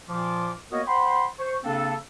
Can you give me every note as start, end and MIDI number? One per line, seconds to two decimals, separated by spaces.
0.09 0.51 46
0.09 0.51 53
0.09 0.51 65
0.09 0.51 86
0.72 0.81 58
0.72 0.81 59
0.72 0.81 66
0.72 0.81 70
0.72 0.81 73
0.72 0.81 75
0.87 1.27 72
0.87 1.27 78
0.87 1.27 79
0.87 1.27 83
0.87 1.27 84
1.39 1.55 72
1.39 1.55 85
1.64 1.94 49
1.64 1.94 58
1.64 1.94 60
1.64 1.94 62
1.64 1.94 69